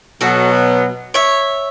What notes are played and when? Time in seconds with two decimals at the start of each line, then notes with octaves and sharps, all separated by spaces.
0.21 B2 F#3 B3 F#4 A4
1.14 C#5 E5